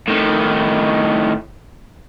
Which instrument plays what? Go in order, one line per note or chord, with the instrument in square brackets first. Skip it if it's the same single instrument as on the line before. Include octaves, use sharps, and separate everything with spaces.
[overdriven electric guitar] A2 D#3